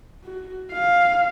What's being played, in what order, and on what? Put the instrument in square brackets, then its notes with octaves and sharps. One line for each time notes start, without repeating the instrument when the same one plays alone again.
[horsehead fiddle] F#4
F5